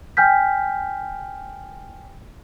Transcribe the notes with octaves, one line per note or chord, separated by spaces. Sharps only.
G5 G#5 F6 G6 B6